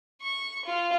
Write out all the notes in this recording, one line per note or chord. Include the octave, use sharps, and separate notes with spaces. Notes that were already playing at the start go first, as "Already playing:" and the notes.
C#6
F4